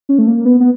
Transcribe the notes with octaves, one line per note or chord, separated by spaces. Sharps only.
C#4
A3
A#3
B3
B3